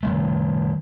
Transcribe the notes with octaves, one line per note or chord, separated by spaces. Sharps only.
D#3 G3 A3